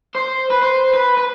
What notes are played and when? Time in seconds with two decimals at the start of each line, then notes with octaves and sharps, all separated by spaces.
0.15 C5
0.50 B4
0.62 C5
0.93 B4
1.17 B4